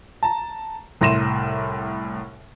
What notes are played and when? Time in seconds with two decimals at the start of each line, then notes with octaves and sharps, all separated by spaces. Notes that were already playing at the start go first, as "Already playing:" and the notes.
0.23 A5 A#5
1.01 C2 A2 C6 A#6 D#7 E7